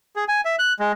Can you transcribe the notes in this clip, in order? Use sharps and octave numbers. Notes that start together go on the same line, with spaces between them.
G#4
G#5
E5
F#6
G#3